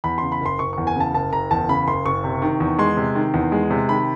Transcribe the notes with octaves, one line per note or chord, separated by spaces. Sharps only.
E2 B5
C#3 C6
B5
F#1 C6
F#1 C#6
E2 C#6
G#5
C#3 A5
F#1 A5
F#1 A#5
E2 A5
C#3 B5
F#1 C6
F#1 C#6
C3
D#3
E2
G#3 C6
C3
D#3
E2
G#3
C3
D#3 B5